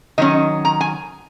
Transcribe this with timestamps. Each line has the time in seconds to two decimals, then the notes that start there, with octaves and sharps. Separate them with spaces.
0.18 D#3 F#3 C#4 D#5
0.65 A#5
0.81 G#5